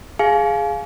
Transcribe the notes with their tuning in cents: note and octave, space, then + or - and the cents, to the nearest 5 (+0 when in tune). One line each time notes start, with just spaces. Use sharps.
G#4 +0 F5 +0 G#5 +35